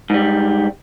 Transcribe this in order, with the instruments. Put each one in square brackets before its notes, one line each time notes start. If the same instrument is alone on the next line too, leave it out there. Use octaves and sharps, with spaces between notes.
[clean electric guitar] G#2 G3